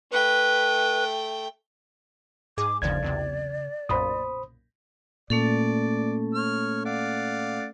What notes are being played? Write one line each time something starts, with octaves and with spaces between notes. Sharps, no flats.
A3 B4 G5
G#2 G#4 D6
G1 D#2 C#3 F3 D5 G#6
B1 E2 C3
B1 F#2 A#2 C5 B5 D#6
A#2 A3 C#4 A4 D5
C#5 F6
D5 F5 F#5